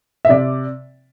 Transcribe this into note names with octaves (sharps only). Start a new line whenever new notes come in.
E5
C3 D5